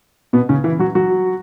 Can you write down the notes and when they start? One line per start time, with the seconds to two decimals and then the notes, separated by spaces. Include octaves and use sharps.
0.33 B2 B3
0.49 C#3 C#4
0.64 E3 E4
0.79 F#3 F#4
0.95 F#3 F#4